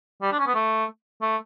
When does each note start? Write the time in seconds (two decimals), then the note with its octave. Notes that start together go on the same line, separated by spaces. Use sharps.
0.22 G3
0.32 D4
0.39 C#4
0.47 B3
0.55 A3
1.21 A3